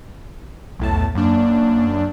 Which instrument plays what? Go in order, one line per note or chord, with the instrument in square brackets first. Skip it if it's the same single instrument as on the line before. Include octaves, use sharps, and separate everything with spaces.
[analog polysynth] B1 A2 A5 [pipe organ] E2
[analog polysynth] F#2 D4 [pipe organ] A#3